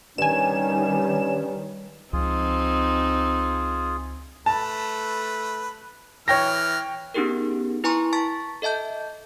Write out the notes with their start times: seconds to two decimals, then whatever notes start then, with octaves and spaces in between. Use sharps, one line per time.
0.18 G2 D#3 G3 C#4 G#5 E7
2.13 C#2 F3 C4 D#4 F4 G#4
4.46 A3 B4 A5
6.28 E3 C#5 G5 F6 A#6
7.14 B3 C#4 D#4 G4 G#4 A#4
7.84 E4 B4 G#5 A#5 C6 C#6
8.13 A5 C#6 A6 B6
8.62 A4 D#5 E5 A5 G6